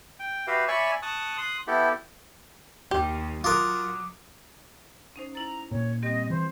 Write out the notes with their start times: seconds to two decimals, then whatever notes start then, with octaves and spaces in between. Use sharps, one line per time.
0.19 G5
0.47 F#4 G4 B4 E5 F5
0.68 C#5 D5 E5 G#5 B5 C#6
1.02 A5 C#6 D#6 F#6
1.38 C6 D#6 F#6
1.67 B3 E4 G4 A4
2.91 D#2 G4
3.44 F#3 F4 A#4 D6 D#6 F#6
5.16 C#4 D#4 C5
5.35 E4 A#5 A6
5.71 A#2 C#5
6.03 G3 C4 G4 D#5
6.30 E3 C5